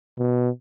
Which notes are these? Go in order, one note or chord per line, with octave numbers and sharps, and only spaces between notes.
B2